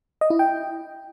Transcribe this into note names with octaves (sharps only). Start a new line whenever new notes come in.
D#5
E4
G5